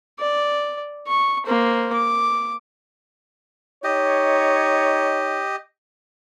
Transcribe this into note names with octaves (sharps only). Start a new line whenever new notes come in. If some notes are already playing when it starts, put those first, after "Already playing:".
D5
C#6
A#3 C5
D6
D#4 G4 C#5 D#5